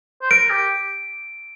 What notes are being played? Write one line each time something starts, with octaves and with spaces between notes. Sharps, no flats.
C5
A#4 D7
G4